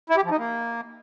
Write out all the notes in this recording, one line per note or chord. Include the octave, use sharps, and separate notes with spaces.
E4
G4
F3
D#4
A#3